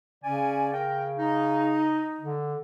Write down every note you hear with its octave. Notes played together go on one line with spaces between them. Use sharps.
C#3 C#4 D5 G#5
A#4 G5
D#4
D3